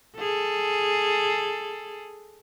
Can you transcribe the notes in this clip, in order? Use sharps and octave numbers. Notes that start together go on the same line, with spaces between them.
G#4 A4